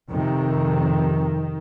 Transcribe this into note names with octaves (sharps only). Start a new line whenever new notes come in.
F2 C3 D#3